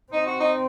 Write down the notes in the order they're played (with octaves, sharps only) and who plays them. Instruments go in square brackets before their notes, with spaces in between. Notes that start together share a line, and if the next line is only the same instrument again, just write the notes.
[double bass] C4 [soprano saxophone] D#4
[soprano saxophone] F#4
D#4